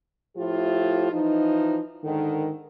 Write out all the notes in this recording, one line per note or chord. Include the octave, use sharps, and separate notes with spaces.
A2 F3 E4 F4 G4
E3 F3 D#4
G#2 D3 D#3